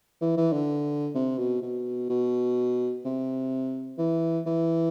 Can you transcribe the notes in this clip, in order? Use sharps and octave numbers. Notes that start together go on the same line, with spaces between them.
E3
E3
D3
C3
B2
B2
B2
C3
E3
E3